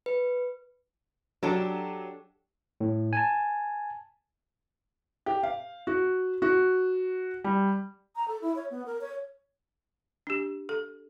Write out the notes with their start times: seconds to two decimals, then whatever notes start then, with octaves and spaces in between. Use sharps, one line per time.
0.06 B4
1.43 F#3 D4 G4 A4
2.80 A2
3.13 G#5 A5
5.26 G4
5.43 F5
5.87 F#4
6.42 F#4
7.44 G3
8.16 A#5
8.28 A4
8.42 E4
8.56 C#5
8.71 B3
8.86 A#4
9.01 C#5
10.27 D4 G4
10.69 A4